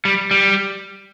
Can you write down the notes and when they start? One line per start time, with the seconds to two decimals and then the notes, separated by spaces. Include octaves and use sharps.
0.05 G3
0.31 G3